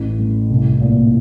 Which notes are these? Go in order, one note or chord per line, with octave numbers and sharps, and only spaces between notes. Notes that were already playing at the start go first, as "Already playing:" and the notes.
Already playing: A1
A2
C2
A#2